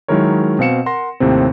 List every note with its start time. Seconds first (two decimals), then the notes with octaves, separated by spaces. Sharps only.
0.08 D#3 F#3 G#3 E4 A#4 C#5
0.59 B2 C4 F5 C#7 E7
0.86 A#4 F#5 C6 A#6
1.20 D#2 A2 C3 C4